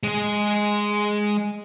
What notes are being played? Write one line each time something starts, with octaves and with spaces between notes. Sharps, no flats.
G#3 G#4